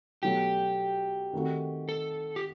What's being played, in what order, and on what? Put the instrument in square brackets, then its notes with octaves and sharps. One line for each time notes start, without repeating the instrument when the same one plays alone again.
[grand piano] B2 F#3 A3 [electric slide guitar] G4
[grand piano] D#3 A3 C4 D#4 F#4
[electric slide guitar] A4
G4